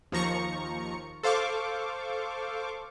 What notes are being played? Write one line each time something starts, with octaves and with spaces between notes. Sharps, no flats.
D#2 F3 A#5 C#6 C#7
A4 C5 F5 C#6 D6